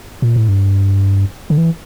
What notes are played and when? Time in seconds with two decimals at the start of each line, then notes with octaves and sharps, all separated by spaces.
0.22 A#2
0.36 A2
0.49 G2
1.50 D3
1.58 E3